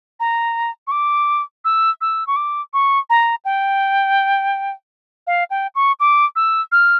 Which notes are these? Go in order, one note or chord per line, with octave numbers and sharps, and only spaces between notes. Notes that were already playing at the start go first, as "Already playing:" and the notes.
A#5
C#6
D6
E6
E6
C#6
D6
C#6
A#5
G5
F5
G5
C#6
D6
E6
F6